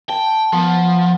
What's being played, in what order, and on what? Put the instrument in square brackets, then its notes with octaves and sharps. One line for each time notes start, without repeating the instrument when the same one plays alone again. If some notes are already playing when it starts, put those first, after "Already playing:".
[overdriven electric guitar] G5 [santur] A5
[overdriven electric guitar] F3 [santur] B3